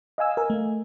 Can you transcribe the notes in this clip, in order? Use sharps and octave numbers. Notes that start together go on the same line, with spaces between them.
D#5 F5 G#5 E6
A#4 G#5
A3